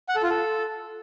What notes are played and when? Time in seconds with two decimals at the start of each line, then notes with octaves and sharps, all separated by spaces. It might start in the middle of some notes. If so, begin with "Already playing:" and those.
0.09 F#5
0.16 A4
0.23 F4
0.30 A4